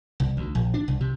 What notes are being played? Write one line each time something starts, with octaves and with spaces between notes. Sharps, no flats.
C2
D2
A#1
D4
C2
C3